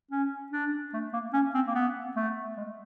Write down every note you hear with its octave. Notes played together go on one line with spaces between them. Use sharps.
C#4
D4
A3
A#3
C#4
C4
A#3
B3
A3
G#3